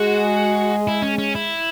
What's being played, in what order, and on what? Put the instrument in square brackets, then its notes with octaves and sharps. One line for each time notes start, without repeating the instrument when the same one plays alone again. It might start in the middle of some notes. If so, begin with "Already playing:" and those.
Already playing: [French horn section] G#3 [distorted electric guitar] F#4
[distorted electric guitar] E4
C#4
C#4
E4